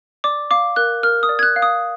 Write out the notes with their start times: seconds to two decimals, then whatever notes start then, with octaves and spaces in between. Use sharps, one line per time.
0.24 D5 D6
0.51 F5 D6
0.76 A#4 F#6
1.03 A#4 F6
1.23 D#6
1.29 D5
1.39 G#6
1.43 F#6
1.56 F5
1.62 D#6